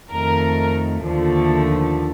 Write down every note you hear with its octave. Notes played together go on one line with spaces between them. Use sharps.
F2 D#3 A3 A#4
D#2 D3 F3 A3